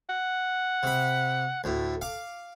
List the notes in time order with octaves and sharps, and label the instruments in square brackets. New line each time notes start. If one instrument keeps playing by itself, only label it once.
[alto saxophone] F#5
[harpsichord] C3 B5
[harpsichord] D2 A2 [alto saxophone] A4
[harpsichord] F5 D6